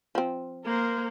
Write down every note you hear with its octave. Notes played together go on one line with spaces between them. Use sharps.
F3 C4
A#3 A#4 C5